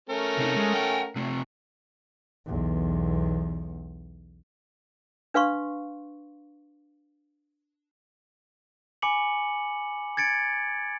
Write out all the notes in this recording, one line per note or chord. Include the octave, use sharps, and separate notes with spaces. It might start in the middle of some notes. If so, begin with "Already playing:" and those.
A3 C#4 A#4
C3 D#4
G#3
F#5 G5
C3 A3
B1 E2
D4 B4 F5 C6 C#6
G#5 B5 D6 C#7 F#7
G#6 A6 C#7 D7